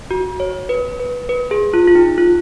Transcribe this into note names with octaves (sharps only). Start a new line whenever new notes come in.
F#4
C#5
B4
B4
B4
G#4
F4
F4
D#4
F4